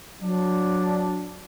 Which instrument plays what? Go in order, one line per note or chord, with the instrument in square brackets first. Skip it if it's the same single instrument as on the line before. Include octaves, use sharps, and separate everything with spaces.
[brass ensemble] F#3 D4